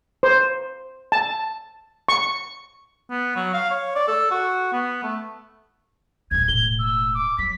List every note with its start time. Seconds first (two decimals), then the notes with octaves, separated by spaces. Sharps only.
0.23 C5
1.12 A5
2.09 C#6
3.10 B3
3.36 F#3
3.54 F5
3.71 C#5
3.96 D5
4.08 A4
4.31 F#4
4.73 B3
5.03 A3
6.31 A#1 D#2 G#6
6.48 E1 A2 G7
6.79 E6
7.14 D6
7.39 F#3 B6